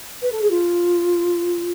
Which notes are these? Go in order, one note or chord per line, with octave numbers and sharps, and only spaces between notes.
B4
A4
G#4
F4